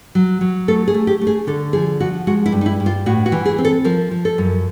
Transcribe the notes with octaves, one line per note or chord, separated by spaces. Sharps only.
F#3
F#3
A3 A4
G#4
A3
G4
A3
G#4
D3 A4
F3 G#4
F3 F#4
G#3 F#4
E4
G2
D#4
E4
G2
F4
A2 F#4
F#4
E3
G#4
C4
A4
F3 A#4
F3
A4
F#2